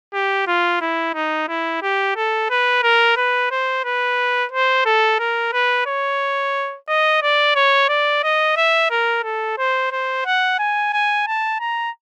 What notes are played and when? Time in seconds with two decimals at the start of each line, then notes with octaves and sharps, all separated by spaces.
0.14 G4
0.47 F4
0.81 E4
1.14 D#4
1.48 E4
1.82 G4
2.16 A4
2.50 B4
2.83 A#4
3.17 B4
3.51 C5
3.85 B4
4.51 C5
4.86 A4
5.19 A#4
5.53 B4
5.87 C#5
6.88 D#5
7.22 D5
7.55 C#5
7.89 D5
8.23 D#5
8.57 E5
8.90 A#4
9.23 A4
9.58 C5
9.92 C5
10.26 F#5
10.59 G#5
10.93 G#5
11.27 A5
11.60 A#5